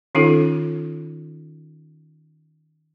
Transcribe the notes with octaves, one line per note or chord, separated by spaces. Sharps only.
D#3 C#4 D#4 F4 A4